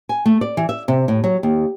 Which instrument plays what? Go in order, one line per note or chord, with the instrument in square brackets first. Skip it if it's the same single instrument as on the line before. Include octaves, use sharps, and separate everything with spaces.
[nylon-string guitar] G#5
A3
D5
E3
E5
C3
A2
F#3
D#2